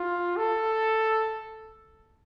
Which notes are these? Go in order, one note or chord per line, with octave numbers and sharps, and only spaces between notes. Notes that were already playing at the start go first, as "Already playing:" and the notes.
Already playing: F4
A4